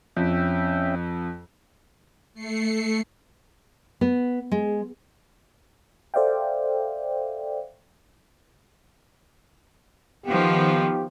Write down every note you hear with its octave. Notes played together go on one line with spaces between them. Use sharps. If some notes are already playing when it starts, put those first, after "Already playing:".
F2 C#4 E5 G5
A3 C7 C#7
B3
G#3
A4 C5 D5 E5 F5 G5
D#3 F3 B3 G4